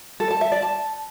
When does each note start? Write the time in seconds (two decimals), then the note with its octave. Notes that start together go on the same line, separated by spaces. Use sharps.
0.20 A4
0.31 A5
0.41 E5
0.52 D5
0.62 A5